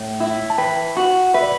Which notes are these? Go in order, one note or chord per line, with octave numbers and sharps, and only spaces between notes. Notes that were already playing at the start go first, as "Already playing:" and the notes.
Already playing: A2
E4
A5
B4 G5
F#4
B4 E5
D5